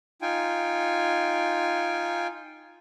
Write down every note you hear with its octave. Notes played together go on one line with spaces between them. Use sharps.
D#4 F4 G5 G#5